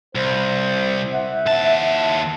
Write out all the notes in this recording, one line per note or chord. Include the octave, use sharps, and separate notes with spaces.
C2 C5
E5 F#5
D#2 A5